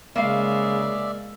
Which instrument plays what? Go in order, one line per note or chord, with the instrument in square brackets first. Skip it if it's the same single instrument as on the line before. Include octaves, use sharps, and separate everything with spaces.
[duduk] C#3 [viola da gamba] G#3 [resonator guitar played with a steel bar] A#3 F5 [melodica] D5 E5